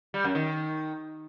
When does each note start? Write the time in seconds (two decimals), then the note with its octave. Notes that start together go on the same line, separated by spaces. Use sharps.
0.14 G3
0.24 F#2
0.35 D#3